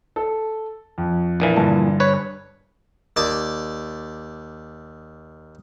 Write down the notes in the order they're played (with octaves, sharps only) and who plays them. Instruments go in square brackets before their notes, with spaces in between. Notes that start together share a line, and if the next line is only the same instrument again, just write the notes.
[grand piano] A4
F2
[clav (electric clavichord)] A#1 A#2 E3
[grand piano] G2 D3 A5
[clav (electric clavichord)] B4 C#5
[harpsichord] D#2 D5 A5